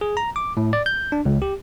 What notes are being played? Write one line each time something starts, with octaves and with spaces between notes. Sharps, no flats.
G#4
A#5
D6
A2
D5
G6
D4
C#2
G4